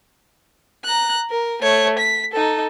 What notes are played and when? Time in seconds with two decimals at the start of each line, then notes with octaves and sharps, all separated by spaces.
0.84 A#5 F#6
1.30 A#4
1.62 A3 C#5
1.98 B6
2.32 D#4 A4